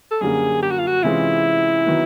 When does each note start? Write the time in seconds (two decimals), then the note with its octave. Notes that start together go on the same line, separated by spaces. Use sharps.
0.11 A4
0.21 F#2 D3 G3 A#3 G#4
0.62 G4
0.71 F#4
0.79 F4
0.87 F#4
1.03 C3 E3 G#3 C#4 E4 F4
1.86 D#3 F#3 B3